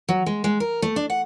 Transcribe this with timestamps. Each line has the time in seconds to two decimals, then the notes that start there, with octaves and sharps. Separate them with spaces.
0.09 F#3
0.26 G#3
0.44 G#3
0.60 A#4
0.82 A3
0.96 D4
1.10 F#5